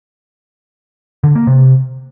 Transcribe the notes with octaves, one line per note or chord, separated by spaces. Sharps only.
D3
A#3
C3